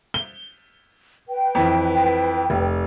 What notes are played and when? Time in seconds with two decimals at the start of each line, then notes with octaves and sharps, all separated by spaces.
0.14 G7
1.28 B4 G5
1.55 F2 E3
2.50 F1